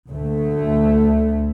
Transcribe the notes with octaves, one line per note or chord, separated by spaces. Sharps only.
D2 A3